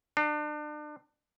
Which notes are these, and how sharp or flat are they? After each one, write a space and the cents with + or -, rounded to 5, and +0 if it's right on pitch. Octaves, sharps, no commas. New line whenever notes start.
D4 +35